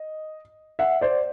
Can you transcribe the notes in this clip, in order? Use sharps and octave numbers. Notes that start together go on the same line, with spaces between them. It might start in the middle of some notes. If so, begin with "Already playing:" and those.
Already playing: D#5
E5 F#5
C5 D5